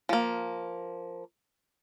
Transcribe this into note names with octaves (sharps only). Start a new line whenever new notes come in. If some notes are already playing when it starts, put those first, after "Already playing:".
F3 A#3